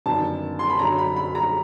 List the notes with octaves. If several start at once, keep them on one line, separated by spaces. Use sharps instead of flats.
G1 F#2 D#3 A5
C6
B5
F#2 D3 F#3 A#5
B5
B5
A#5